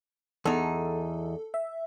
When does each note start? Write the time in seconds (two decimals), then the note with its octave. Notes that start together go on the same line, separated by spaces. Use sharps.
0.45 E2 D#4 A4
1.54 E5